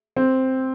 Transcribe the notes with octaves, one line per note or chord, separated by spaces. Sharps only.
C4